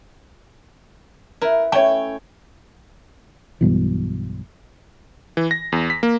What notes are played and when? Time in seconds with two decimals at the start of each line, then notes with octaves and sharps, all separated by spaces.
1.41 E4 A#4 B4
1.72 A3 C#4 E4 C#5 G5
3.61 B1 G2 B2 E3
5.37 E3
5.51 A#6
5.72 E2
5.90 B6
6.03 A#3